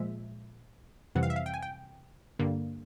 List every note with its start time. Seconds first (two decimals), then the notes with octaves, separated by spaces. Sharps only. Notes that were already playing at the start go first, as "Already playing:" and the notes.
Already playing: A#2 F3 G#3 E5
1.15 F2 C3 E3 G3 C4 F#5
1.23 F5
1.30 E5
1.36 F5
1.46 G5
1.54 G#5
1.63 G5
2.39 G2 D3 G3 A#3